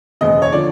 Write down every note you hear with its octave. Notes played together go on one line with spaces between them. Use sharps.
F#1 E2 B2 D#5
C#5
D3 F3 D5